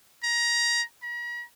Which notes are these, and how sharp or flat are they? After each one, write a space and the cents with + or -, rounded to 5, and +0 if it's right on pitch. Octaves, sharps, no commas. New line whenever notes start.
A#5 +20
A#5 +45